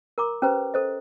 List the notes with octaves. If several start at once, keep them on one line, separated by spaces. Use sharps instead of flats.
A#4 A#5 D6
C#4 G4 B4 C5 A#5
A4 C5 D#5